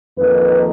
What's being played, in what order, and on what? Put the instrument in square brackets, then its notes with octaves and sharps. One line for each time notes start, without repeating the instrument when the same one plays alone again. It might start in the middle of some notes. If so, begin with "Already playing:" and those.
[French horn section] F2 D#3 A#3 B4